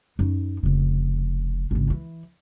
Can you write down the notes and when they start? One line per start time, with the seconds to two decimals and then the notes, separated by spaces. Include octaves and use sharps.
0.19 F#2 D#4
0.63 F1 C#3
1.71 G#1 C#2
1.90 E3